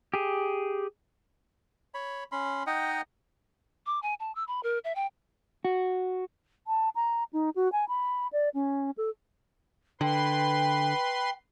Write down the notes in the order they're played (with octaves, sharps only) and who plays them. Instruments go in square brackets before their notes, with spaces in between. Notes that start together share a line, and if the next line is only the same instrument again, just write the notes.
[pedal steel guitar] G4 G#4
[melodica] C#5 B5
C#4 B5 C6
D#4 D#5 F#5 G5
[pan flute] D6
G#5
A5
E6
B5
A#4
E5
G5
[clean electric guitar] F#4
[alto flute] A5
A#5
D#4
F#4
G#5
B5
D5
C#4
A4
[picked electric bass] D3 [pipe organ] B4 C6 [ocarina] G5